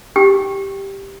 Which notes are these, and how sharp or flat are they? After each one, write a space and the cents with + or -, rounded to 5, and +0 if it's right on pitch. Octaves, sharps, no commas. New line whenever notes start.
G4 +0 G5 +0